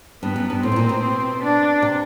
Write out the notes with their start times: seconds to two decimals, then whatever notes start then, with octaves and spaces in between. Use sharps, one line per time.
0.23 G2 B3
0.36 F#2
0.50 G2
0.63 A2 C4
0.72 B2
0.76 A#2
0.89 B2
1.43 D4
1.82 C3